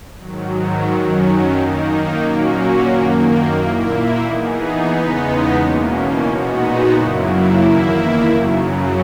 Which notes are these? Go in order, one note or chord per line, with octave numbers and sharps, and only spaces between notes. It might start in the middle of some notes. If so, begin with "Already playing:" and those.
G#2 D#3 F#3
F#2 D#3 F#3 C#4
D#3 A#3 D#4
A#2 F#3 A#3 C#4 F#4
F#2 D#3 A#3
A#2 A#3 E4
E3 B3 D#4 G#4
E2 C#3 G#3 B3 D#4
E2 B2 A#3 C#4
A#2 G#3 B3 D#4 F#4
F#2 C#3 F#3 A#3 E4
E2 D#3 A#3 E4
F#2 C#3 F#3